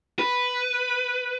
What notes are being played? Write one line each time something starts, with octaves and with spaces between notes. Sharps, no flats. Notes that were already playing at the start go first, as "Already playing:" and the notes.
B4